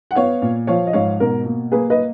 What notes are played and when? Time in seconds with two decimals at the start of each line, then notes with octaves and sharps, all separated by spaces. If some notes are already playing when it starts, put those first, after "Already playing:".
0.11 F#5
0.15 B3 C#5 F5
0.42 A#2
0.67 F3 C#5 F5
0.87 D#5
0.93 G#2 C#5 F5
1.20 B2 A#4
1.46 A#3
1.72 A#3 G#4 B4
1.90 B4 D#5